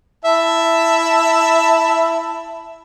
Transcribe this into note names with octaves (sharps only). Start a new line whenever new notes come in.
E4 E5 A5